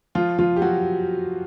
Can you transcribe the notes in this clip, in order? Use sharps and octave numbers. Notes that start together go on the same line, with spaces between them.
F3 F4
F3 F4
G4
F#3 F#4